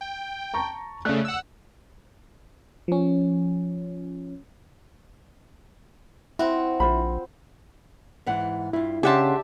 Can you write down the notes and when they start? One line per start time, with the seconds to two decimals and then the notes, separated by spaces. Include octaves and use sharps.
0.01 G5
0.54 A5 A#5 C#6
1.05 C#3 A3 D5 F#6
1.25 F#5 E6
2.88 F3 C#4
6.39 C4 E4 F#4
6.80 A#1 F4 C5 B5
8.26 G#2 E3 F#5
8.73 G2 E4 F4
9.03 C#3 D4 G4 G#4 E5 F#5 A5 C6